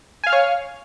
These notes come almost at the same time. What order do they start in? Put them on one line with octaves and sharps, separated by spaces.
G#5 F5 F6 C#5